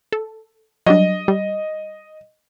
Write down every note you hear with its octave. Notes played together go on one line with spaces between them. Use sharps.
A4
F#3 G3 D4 D#5
G3